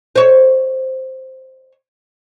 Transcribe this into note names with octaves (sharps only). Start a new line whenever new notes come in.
C5 C#5